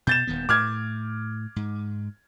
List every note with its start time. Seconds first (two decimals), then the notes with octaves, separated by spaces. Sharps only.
0.07 B2 G6 A6 E7
0.27 D#1 D#3 B3
0.49 A2 D6 F6 G#6
1.56 G#2